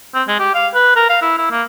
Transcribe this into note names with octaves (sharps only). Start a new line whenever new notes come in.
C4
G#3
G4
F5
B4
A#4
F5
E4
E4
A#3